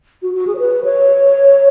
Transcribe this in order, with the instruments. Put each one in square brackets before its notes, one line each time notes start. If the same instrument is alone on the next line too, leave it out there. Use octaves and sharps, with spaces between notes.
[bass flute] F#4
F#4
G#4
C#5
B4
C#5